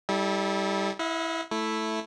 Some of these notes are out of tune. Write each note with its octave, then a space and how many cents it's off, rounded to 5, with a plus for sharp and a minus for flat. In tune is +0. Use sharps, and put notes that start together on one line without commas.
G3 +0 E4 -35 A4 -15
E4 +0 D#5 +45 F#5 -40
A3 +0 E4 +0